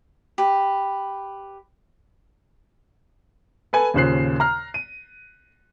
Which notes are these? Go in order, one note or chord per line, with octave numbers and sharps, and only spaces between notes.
G4 B4
A4 B4 G#5
D#2 A#2 C#3 C5 F#6 C7
A#5 F6
D#7